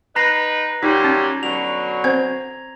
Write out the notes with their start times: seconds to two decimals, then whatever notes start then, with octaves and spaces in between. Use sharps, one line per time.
0.16 D#4 B4 A#5 A#6 C7
0.83 A#2 F#3 G3 D#4
1.04 C#4
1.43 B2 D3 F#3 F7
2.04 C4 C5 G#6